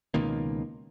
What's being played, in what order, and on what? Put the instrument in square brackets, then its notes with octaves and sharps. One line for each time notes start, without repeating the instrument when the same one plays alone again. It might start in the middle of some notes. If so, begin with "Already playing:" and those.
[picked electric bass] C#2 B2 D#3 A#3